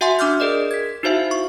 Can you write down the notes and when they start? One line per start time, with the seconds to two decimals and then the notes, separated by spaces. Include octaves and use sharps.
0.01 F#4 E5 F#5 G#5 C6
0.19 D4 D6 F6 G6
0.40 G#4 A#4 D5 D#5
0.71 G#6 B6
1.03 D#4 E4 F#4 C5 E5 F5
1.31 C#6